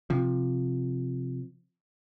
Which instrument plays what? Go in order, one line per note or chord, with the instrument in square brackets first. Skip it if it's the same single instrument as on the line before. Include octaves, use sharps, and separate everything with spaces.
[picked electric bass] C3 F3